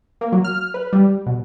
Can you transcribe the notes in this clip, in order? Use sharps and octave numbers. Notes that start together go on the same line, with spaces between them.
A#3
F#3
F6
B4
G3
B2